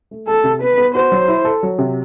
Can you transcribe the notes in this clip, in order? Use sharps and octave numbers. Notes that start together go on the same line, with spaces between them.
A3
A3 A4
C3
B3 B4
B3
F#4 C5
F#3
E4
A4
F#3
C3